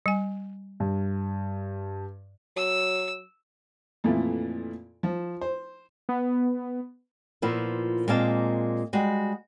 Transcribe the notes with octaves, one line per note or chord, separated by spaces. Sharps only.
G3 G#5
G2
F#3 E6
F2 A#2 E3 A3 F4
F3
C5
B3
A#2 F3 B3 E4
A#2 G#3 A#3 C4 F5 A5
G3 G#3 F#4